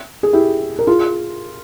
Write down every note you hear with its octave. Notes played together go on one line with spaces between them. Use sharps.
G#4
E4 G4
A#4
F4 G#4